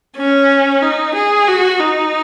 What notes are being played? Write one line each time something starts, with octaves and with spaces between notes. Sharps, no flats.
C#4
D#4
G#4
F#4
D#4